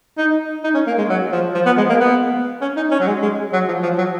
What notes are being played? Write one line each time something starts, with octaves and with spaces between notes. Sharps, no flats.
D#4
D#4
C#4
A#3
G#3
F#3
F3
F3
B3
G#3
A#3
B3
C#4
D#4
C#4
F#3
G#3
G#3
F#3
F3
F3
F#3